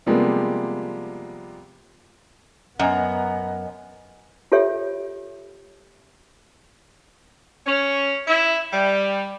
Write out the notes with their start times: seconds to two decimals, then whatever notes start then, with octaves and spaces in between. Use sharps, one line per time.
0.06 C3 F3 G3 G#3 A#3 B3
2.79 F#2 B3 D#5 F#5 G#5 A#5
4.52 F4 G4 A4 C#5 E5
7.66 C#4
8.27 E4
8.72 G3